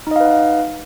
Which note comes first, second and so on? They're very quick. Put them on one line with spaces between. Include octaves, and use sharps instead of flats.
D#4 D#5 F5 B4 F#5